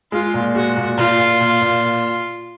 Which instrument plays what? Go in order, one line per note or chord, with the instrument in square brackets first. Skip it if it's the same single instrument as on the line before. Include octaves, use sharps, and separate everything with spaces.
[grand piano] G#3 [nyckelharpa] F4
[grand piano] A#2
[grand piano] G#3 [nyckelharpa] F#4
[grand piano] A#2
[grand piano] A#2 [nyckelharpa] F4
[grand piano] A#2
A#2
A#2